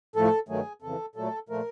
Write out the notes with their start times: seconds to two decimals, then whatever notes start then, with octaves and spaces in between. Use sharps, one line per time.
0.16 A2 F3 A3 A4
0.49 G2 D#3 F#3 A3 G#4
0.82 F2 C#3 E3 A4
1.16 A#2 F#3 A3 A4
1.49 A#2 F3 A3 A#4